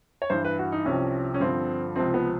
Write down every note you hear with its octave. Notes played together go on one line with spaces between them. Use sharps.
C#5
G2 E3 C5
B4
F#4
D#4
C2 C3 F3 C#4
C#4
G2 D3 F3 C4
C#2 C3 F3 C4
B3